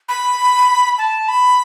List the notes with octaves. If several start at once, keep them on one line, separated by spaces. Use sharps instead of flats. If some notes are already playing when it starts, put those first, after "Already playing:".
B5
A5
B5